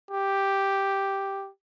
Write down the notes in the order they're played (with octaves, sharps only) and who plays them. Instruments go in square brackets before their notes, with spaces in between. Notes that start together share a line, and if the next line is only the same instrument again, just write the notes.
[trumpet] G4